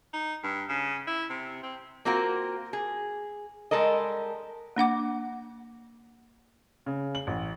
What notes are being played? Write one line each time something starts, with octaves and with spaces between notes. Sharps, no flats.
D#4
G2
C#3
E4
C3
C4
A#3 C4 F4 F#4 A#4
G#4
G3 G#3 A4 A#4 D#5
A#3 D4 F#5 D6
C#3
F#7
A1